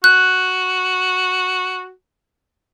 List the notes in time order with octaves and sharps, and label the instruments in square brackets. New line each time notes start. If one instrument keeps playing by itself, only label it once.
[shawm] F#4 [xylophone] F#6